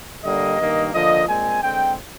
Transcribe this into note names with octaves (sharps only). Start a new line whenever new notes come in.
D3 G3 A#3 D#5
G2 D#3 A#3
D3 F3 A#3 D#5
A#2 G#3 C4 G#5
D3 G#3 C4 G5